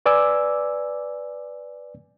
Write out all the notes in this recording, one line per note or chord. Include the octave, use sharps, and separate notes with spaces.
B4 D5 G#5 D6 E6